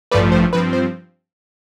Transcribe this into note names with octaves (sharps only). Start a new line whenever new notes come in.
A1 G2 F3 A3 B4 D5
C5
G2 F3 C4 B4
C5